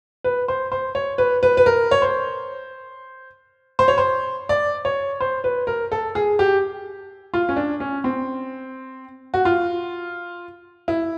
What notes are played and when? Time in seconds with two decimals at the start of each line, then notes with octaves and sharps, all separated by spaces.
0.24 B4
0.48 C5
0.72 C5
0.95 C#5
1.18 B4
1.43 B4
1.57 B4
1.66 A#4
1.91 C#5
2.02 C5
3.79 C5
3.88 C#5
3.98 C5
4.49 D5
4.85 C#5
5.21 C5
5.44 B4
5.67 A#4
5.92 A4
6.15 G#4
6.39 G4
7.34 F4
7.49 C#4
7.56 D4
7.80 C#4
8.04 C4
9.34 F#4
9.45 F4
10.88 E4